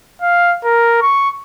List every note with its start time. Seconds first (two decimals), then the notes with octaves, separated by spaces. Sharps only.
0.22 F5
0.65 A#4
1.02 C#6